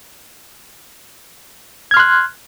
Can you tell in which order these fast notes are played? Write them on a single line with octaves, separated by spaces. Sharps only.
G#6 F6 C6 F#6